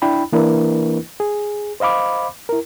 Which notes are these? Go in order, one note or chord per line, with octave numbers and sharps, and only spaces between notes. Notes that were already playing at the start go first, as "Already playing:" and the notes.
D4 E4 G5 B5
E3 A#3 D4 E4 A#4 B4
G#4
C5 D#5 F5 B5 D6
E4 A#4